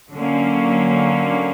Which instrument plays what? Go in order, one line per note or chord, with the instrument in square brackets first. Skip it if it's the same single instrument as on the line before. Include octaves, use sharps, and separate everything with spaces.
[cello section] D3 F#3 A#3 C#4